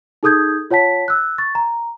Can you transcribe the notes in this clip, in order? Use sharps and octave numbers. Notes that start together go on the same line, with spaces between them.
D#4 G#4 A4 D#6 G6 G#6
F4 C#5 F#5 A5 B6
E6 F#6
C#6 A6
A#5